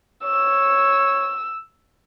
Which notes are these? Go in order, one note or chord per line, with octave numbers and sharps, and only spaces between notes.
C#5 E6